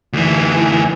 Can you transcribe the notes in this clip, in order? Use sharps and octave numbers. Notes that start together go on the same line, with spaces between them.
D2 E3